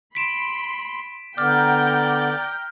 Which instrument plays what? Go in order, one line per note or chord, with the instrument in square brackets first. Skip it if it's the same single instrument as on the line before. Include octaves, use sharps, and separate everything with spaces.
[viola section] B5 C6 [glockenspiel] B6 D7 E7
[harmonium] D3 B3 [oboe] D5 [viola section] G5 A#5 [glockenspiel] F6